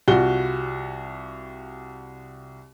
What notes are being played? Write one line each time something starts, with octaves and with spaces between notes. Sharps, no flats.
C2 F4 F#4 G7